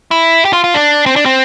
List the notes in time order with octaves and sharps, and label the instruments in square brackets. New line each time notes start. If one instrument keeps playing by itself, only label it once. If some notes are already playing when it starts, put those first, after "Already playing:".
[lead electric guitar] E4
G4
F4
F4
D4
C4
D4
C4